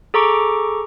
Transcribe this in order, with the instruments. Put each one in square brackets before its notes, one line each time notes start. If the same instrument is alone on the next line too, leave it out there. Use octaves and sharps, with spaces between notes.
[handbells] G#4 A4 A#5 C#6 D6